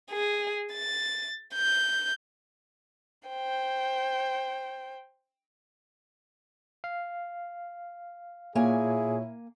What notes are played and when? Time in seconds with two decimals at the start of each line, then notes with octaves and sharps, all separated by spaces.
0.11 G#4
0.73 A6
1.55 G6
3.29 C5 G5
6.84 F5
8.55 A#2 A#3 E4 G#4 C#5 G#5